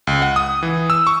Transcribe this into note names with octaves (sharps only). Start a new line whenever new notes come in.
C#2
F#5
D#6
E3
E6
C#6